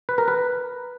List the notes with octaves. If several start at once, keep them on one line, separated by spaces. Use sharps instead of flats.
B4
A#4
B4